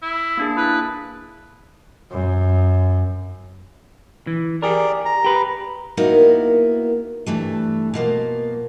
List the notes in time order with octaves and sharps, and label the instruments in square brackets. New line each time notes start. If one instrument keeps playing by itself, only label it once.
[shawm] E4
[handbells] A#3 D4 G#4
[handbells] E4 [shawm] B4
[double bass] F#2
[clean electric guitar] E3
[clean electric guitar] G4 G#4 A#4 [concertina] D5
[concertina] A#5
[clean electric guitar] G4 B4
[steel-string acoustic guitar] A#3 B3 D#4 E4 F#4 A#4
G2 E3 A3
B2 F3 A#3